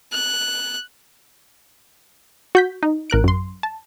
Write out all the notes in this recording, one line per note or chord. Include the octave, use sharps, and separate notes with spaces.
F#6
F#4 G6 B6
D#4
A1 A#4 F#6 D7
F#2 C6
A5